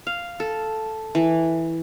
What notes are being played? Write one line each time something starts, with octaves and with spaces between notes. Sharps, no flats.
F5
A4
E3